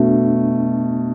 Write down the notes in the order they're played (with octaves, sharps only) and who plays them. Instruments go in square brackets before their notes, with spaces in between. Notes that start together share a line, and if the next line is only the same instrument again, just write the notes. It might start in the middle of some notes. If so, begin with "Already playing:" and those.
Already playing: [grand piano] B2 A3 [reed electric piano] D4